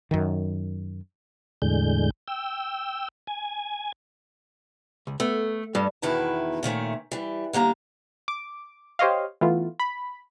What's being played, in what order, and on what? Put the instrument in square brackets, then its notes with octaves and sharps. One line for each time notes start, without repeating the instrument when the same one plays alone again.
[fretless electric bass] F#2 D#3
[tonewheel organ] E2 A2 D3 G#3 G6
G5 E6
G#5
[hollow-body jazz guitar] C#2
[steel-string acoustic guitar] A3 [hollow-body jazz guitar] B3
[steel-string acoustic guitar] G2 [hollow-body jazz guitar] G3
[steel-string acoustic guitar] E2 B2 D#3 E4 B4 A5
A#2 D#3 A3 C#4
E3 G3
D3 G3 A#3 A#5
[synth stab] D6
G4 C5 C#5 D#5 F5
E3 A3 B3 F4
B5